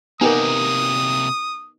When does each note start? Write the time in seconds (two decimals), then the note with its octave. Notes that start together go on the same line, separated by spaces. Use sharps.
0.21 C3 A#3 B3 D#4 G4 A#4 G#5 D#6